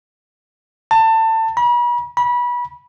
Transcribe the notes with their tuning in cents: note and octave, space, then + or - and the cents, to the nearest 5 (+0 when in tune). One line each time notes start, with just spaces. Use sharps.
A5 +25
B5 -40
B5 -25